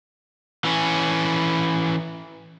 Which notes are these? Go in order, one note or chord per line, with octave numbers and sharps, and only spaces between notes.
E3 C#4